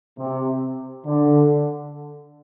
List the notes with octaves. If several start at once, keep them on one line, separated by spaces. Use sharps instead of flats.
C3
D3